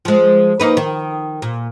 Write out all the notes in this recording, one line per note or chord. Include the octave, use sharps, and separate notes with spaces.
F3 G#3
A#3 D#4 B4
D#3
A#2